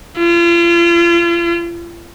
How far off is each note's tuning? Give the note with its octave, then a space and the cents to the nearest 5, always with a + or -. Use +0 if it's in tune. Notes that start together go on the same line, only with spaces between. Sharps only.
F4 -40